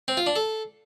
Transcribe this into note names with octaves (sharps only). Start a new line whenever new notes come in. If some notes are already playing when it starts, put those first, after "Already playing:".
C4
F4
D4
A4